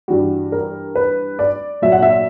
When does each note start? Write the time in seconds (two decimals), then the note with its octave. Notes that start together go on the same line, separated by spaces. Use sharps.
0.08 G2 E3 G3 F#4
0.52 A#4
0.95 B4
1.39 D5
1.82 A#2 F#3 E5
1.92 F#5
2.02 E5